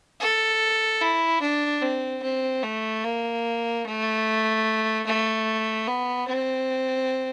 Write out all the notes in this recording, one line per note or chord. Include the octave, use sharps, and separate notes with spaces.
A4
E4
D4
C4
C4
A3
A#3
A3
A3
B3
C4